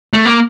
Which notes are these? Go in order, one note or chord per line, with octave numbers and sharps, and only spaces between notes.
A3
A#3